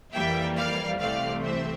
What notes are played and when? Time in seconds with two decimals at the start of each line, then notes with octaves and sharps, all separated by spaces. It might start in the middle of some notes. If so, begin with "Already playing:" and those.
0.13 F2 E3 G3 A#3 E5 G5
0.57 D5 F5
1.00 C2 C3 E3 A3 C4 D5 F5
1.44 C5 E5